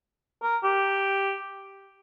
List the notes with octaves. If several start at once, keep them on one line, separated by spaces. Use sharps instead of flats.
A#4
G4